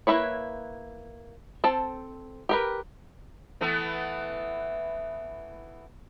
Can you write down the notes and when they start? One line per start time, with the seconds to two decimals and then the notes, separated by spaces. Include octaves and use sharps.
0.07 A#3 E4 B4 C#5
1.64 C4 A4 A5
2.49 G4 A#4 B4
3.61 E3 A3 B3